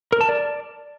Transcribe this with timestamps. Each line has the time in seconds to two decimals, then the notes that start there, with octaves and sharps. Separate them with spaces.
0.12 A#4
0.21 A5
0.29 D5